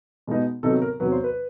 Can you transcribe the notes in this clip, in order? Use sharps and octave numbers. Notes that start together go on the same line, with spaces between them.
B2 G#3 B3 D#4
C3 D#3 F#3 B3 D#4 A4
A#4
E2 C3 D#3 F#3 B4
C5
B4